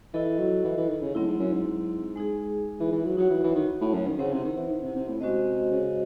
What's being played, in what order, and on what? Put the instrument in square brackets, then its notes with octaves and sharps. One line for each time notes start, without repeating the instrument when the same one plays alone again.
[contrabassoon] E3 [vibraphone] E4 A4 D#5
[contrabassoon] F#3
E3
E3
D#3
C#3
[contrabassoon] A2 [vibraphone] F#3 C4 E4
[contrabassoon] G#2
F#2
G#2
[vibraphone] G#3 D#4 G#4
[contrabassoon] E3
E3
F#3
[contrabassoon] F#3 [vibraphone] D#4 F#4 C#5 F#5
[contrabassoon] E3
E3
D#3
A2
F#2
D#3
[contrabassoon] C#3 [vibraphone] C4 E4 C5 F#5
[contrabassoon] C3
D#3
E3
D#3
C3
C3
A2
[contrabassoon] C3 [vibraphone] G#3 C#4 F#4 C5 D#5
[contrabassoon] C#3